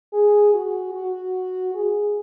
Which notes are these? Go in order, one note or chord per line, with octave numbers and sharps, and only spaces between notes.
G#4
F#4
F#4
G#4